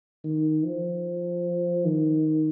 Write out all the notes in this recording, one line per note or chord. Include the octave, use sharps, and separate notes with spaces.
D#3
F3
D#3